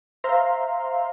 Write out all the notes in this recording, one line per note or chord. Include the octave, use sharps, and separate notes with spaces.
C5 E5 F5 A#5 C6